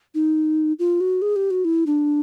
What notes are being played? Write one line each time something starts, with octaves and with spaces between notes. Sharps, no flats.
D#4
F4
F#4
G#4
G4
F#4
E4
D4